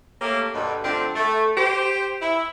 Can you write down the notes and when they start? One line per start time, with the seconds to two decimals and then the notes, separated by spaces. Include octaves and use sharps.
0.22 A3 A#3 C#4 G4 A4 A#4
0.55 G2 B2 D3
0.84 D3 F3 A3 C4 D4
1.16 A3
1.58 G4 C5
2.22 E4